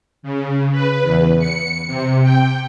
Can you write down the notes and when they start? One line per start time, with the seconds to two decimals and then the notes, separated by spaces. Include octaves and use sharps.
0.23 C#3
0.72 B4
1.03 E2
1.39 C#7
1.87 C3
2.23 G5